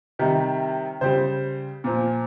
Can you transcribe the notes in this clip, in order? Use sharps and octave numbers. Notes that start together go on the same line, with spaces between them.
C3 D#3 G3
C#3 G3 C5
A#2 F3